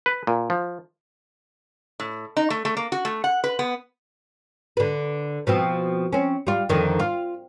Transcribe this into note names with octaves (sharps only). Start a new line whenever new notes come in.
B4
A#2
F3
A2
D#4
A3
A3
A#3
F#4
A3
F#5
B4
B3
D3 B4
B2 F3 C4
C4 C#4
G3 F4
F2 D3 D#3
F4